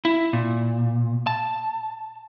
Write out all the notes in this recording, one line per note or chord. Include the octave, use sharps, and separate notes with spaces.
E4
A#2
A5